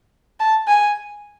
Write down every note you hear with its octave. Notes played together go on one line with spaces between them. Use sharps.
A5
G#5